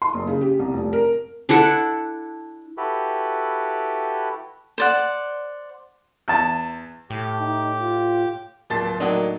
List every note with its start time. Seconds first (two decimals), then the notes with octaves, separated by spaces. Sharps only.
0.02 C6
0.14 F#1
0.27 C#3
0.41 G4
0.59 C2
0.73 F1
0.93 A#4
1.49 D4 E4 A4 F#5
2.77 E4 F#4 G4 A4 B4
4.78 C5 D5 F#5
6.28 E2 A5
7.10 A2 G4 D6
7.40 D#4
7.80 F4
8.70 D1 A#2 A5 A6
9.00 A2 F#3 A#3 D4 D#4